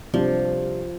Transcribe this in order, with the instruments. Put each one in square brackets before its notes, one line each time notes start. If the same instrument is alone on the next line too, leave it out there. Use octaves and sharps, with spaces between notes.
[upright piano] C3 G3 D4 F4 [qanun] F3